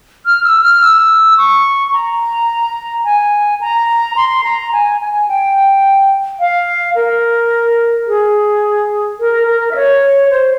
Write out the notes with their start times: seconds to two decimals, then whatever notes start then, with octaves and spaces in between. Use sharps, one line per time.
0.26 F6
0.44 E6
0.62 F6
0.81 E6
1.38 C#6
1.93 A#5
3.05 G#5
3.61 A#5
4.16 C6
4.44 A#5
4.73 G#5
5.01 G#5
5.28 G5
6.40 F5
6.95 A#4
8.07 G#4
9.20 A#4
9.47 A#4
9.71 E5
9.76 C#5
10.30 C5